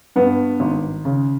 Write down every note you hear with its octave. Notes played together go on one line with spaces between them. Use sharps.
G2 B3
G#1
C#3